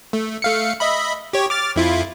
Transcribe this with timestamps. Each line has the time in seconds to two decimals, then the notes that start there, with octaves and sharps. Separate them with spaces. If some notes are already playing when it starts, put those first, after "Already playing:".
0.13 A3
0.42 A3 F5 C#7
0.80 D#5 E5 B5
1.33 G4 C#5
1.50 D6 F6 A6
1.76 F2 E4 F4